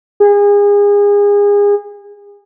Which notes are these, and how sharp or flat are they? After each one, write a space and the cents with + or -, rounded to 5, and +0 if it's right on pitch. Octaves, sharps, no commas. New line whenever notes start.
G#4 -30